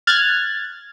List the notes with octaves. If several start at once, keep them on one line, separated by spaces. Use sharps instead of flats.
F6 F#6 G#6 A6